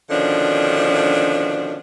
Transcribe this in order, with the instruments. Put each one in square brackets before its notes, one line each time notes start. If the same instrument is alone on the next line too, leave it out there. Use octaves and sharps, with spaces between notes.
[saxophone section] B2 D3 D#3 F3 C#4 D4